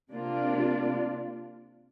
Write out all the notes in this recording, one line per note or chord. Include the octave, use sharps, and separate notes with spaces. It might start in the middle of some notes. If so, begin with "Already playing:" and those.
C3 A#3 D4 F4